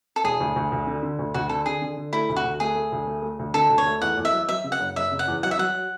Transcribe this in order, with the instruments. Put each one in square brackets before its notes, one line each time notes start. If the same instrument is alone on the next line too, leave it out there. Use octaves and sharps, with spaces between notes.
[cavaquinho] A4
[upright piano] E1 [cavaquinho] G#4
[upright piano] D2
D2
D2
D3
D3
D2
[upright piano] D2 [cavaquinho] F#4
[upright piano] D3 [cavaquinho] A4
[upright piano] D3 [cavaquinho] G#4
[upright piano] D3
D3
[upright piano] A3 [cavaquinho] E4
[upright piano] D2
[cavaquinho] F#4
[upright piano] D2
[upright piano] A3 [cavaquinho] G#4
[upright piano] A3
D2
A3
A3
D2
[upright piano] D3 [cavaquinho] A4
[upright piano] D2
[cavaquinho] C#5
[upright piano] A3
[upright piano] E2 [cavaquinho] F#5
[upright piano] E2
[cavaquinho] E5
[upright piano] F#3
[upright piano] F#3 [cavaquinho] E5
[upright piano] C#3
[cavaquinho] F#5
[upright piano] F#1
[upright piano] F#1 [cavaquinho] E5
[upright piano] C#3
[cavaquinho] F#5
[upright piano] E2
[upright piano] F#3 [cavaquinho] F#5
[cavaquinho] E5
[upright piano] F#3 [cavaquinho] F#5